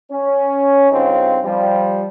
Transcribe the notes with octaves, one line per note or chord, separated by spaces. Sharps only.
C#4
G2 C#3 C4 D#4 F4
F3 G3